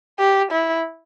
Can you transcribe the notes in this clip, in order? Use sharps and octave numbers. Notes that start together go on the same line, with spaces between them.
G4
E4